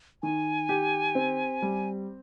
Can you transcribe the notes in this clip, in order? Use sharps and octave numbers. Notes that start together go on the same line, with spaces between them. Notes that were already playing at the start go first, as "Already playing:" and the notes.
D#3 G#5
G4
C4
G3